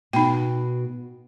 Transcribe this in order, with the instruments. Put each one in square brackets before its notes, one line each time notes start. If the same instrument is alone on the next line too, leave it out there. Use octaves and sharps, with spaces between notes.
[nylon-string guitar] B2 [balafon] D#4 G5